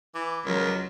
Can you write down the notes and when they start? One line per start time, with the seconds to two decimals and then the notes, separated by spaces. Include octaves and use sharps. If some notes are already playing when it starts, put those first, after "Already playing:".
0.15 E3 D6
0.45 C#2 F#3 A#4